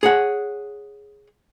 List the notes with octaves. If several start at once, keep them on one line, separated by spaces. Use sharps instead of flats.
G#4 C#5 F#5